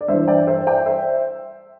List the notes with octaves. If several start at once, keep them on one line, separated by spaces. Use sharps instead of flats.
D5
G2 E3 C5 E5
D5 G5
C5 E5
D5 G5
C5 E5